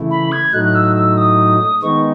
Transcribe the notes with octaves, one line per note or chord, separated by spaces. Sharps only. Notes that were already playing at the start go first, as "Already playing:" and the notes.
Already playing: C#3 E3 A3 E4
B5
G#6
A2 F#3 A3 D#4 F#6
F#6
E6
E6
D#6
D#3 G#3 B3 D#4 C#6